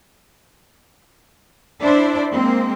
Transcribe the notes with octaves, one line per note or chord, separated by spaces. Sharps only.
D4 E4 C5 D5
G#3 A#3 C4